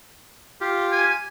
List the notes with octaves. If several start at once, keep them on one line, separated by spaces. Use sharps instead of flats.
F4 G4
G#5